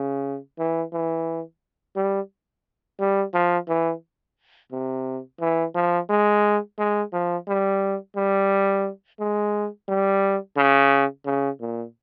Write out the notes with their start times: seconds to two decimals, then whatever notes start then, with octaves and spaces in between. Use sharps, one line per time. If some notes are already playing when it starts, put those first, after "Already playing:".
Already playing: C#3
0.59 E3
0.93 E3
1.96 G3
3.00 G3
3.34 F3
3.68 E3
4.72 C3
5.41 E3
5.75 F3
6.10 G#3
6.78 G#3
7.13 F3
7.48 G3
8.16 G3
9.20 G#3
9.88 G3
10.57 C#3
11.26 C#3
11.61 A#2